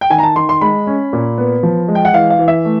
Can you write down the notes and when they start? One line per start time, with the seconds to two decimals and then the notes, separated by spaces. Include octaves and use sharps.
0.01 G5
0.10 D#3 G#5
0.19 A#5
0.23 A5
0.36 D#3 C6
0.49 C6
0.61 G#3 B5
0.87 C#4
1.13 A#2
1.38 B3
1.63 F3
1.88 G#3
1.95 G5
2.05 F#5
2.13 E3 F5
2.30 F5
2.39 E3
2.48 E5
2.65 A3